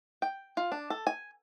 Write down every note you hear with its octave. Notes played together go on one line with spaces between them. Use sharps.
G5
F4
D4
A4
G#5